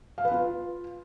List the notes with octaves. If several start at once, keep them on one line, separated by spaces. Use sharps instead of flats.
F5
B4
F4